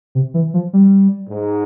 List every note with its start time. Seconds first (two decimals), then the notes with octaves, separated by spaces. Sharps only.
0.15 C3
0.34 E3
0.54 F3
0.73 G3
1.30 G#2